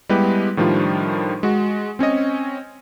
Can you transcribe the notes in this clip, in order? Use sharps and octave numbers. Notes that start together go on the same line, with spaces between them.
G3 G#3 B3 E4 G4 B4
A2 D#3 F3 G3 D4 F4
G#3 F#4
C4 C#4 C#5 D#5